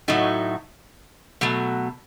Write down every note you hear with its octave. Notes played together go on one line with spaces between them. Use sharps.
A2 F#3 A3 D#4 F#4
B2 F#3 A3